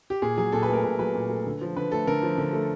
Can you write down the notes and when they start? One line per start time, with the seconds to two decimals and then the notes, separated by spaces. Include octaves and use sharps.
0.10 G4
0.22 A#2 G#4
0.37 F#3 G#4
0.52 A#2 A4
0.63 B4
0.68 A3 A#4
0.84 A#2 B4
0.99 F#3 B4
1.15 A#2
1.30 A3
1.46 D3
1.61 F3
1.76 D3 B4
1.92 A3 A4
2.07 D3 A#4
2.23 F3
2.38 D3
2.53 A3